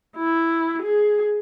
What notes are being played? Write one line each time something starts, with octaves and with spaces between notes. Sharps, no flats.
E4
G#4